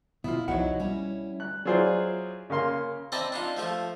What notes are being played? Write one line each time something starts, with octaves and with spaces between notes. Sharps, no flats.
B2 B3 E4 F4
C2 B2 F3 D#4 E4 F#4 C#5 F#5
G3 C#4 E4
F#6
F#3 E4 F4 G#4 C5 D5
C#3 A#3 F5 C6
C4 E4 D5 D#5 A5 A#5
D4 D#4 F4
F3 A3 F4